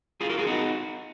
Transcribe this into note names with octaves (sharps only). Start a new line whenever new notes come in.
F4 G#4
F#4 A#4
F4 G#4
D#4 F#4